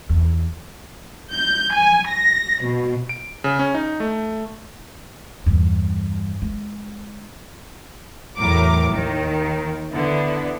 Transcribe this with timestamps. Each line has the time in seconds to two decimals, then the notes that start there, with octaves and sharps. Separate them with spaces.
0.09 E2
1.30 G6
1.72 G#5
2.08 A#6
2.63 B2
3.09 D7
3.44 C#3
3.59 C#4
3.74 D#4
4.00 A3
5.46 E2 G2
6.42 G#3
8.38 E2 A2 F#3 A#4 D6
8.90 D#2 D#3
9.92 D3 B3 E4